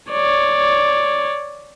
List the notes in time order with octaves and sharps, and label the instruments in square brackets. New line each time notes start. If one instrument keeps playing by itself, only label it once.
[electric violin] C#5 D5